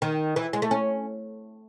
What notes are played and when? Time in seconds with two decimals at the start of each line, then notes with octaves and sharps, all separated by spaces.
0.02 D#3
0.36 E3
0.53 G#3
0.62 A3
0.71 C#4